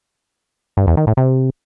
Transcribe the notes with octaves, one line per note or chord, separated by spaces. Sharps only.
G2
E2
D#3
A2
C3